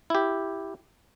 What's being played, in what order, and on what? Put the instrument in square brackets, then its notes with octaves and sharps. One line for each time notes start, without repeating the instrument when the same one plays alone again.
[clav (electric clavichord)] E4 G4